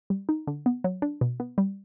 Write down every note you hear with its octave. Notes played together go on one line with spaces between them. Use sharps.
G3
D#4
D3
B3
F#3
D4
B2
B3
G3